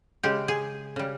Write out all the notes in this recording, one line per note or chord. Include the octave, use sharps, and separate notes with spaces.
C#3 G#3 G4
G#4
C#3 G3